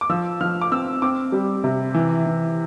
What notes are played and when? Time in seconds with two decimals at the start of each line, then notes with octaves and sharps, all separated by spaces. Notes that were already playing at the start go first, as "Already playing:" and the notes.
0.01 D6
0.09 F3 E6
0.41 F3 F6
0.62 D6
0.71 C4 E6
1.02 C4 D6
1.32 G3
1.64 C3
1.94 E3
2.26 E3